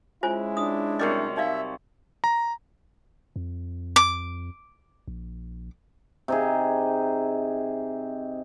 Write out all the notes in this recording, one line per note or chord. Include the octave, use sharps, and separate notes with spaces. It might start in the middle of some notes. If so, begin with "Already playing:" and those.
G#3 C#4 E4 F4 C5 G#5
D4 D#6
C3 F#3 G3 A#4 D#5
D#4 D5 E5 F5
A#5
F2
D6
A#1
C3 D#4 G#4